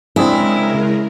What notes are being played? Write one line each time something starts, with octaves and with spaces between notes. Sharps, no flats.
C#3 G#3 C4 D4 E4 G#4 A#4